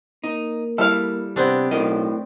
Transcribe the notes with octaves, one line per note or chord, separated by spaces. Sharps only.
A#3 D#4
G3 E4 A4 F5
C3 B3 C4 D4
B1 A2 A#4 D#5